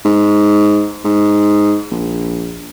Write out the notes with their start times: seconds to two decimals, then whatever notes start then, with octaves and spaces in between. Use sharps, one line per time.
0.05 G#2
1.05 G#2
1.91 A#1